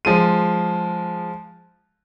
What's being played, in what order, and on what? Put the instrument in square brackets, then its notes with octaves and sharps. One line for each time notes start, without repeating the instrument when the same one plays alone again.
[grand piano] F3 G#3 D#7